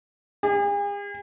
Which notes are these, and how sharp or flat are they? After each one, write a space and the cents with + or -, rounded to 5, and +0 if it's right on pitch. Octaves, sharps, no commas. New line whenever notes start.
G#4 -45